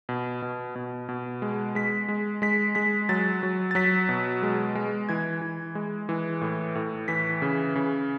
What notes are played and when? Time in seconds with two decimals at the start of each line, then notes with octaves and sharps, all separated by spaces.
0.09 B2
0.42 B2
0.75 B2
1.09 B2
1.42 G#3
1.75 G#3 B6
2.08 G#3
2.42 G#3 B6
2.75 G#3 B6
3.09 F#3 A6
3.43 F#3
3.71 A6
3.75 F#3 B6
4.09 B2
4.43 G#3
4.75 G#3
5.09 E3 G#6
5.41 E3
5.75 G#3
6.09 E3
6.41 A2
6.75 A2
7.08 E3 B6
7.42 C#3
7.75 C#3